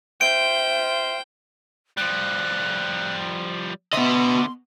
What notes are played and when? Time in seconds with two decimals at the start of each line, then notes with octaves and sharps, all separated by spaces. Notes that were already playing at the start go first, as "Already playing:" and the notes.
0.21 F4 C5 E5 G5 D7
1.97 F3 G3 F#6
3.93 D3 B3 D#5 E5 C6